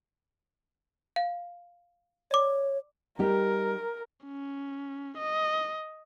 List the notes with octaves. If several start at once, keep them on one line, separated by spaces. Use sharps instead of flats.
F5
C#5 D5 D6
G3 D#4 G4 A#4
C#4
D#5